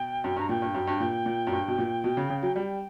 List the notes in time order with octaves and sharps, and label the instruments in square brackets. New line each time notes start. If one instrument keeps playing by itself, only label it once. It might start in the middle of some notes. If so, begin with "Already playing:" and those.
Already playing: [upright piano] B2 [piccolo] G5
[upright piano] F#2
[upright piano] G2 [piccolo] A#5
[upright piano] A#2 [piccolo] G5
[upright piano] G2
F#2
G2
A#2
A#2
F#2
G2
B2
A#2
B2
C#3
C#3
F#3
[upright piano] G3 [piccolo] G5